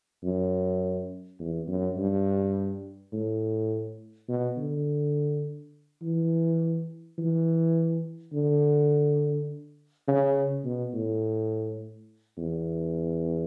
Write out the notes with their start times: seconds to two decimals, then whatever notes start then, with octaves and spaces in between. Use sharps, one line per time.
0.23 F#2
1.40 E2
1.68 F#2
1.97 G2
3.13 A2
4.29 B2
4.57 D3
6.03 E3
7.18 E3
8.33 D3
10.08 C#3
10.65 B2
10.94 A2
12.38 E2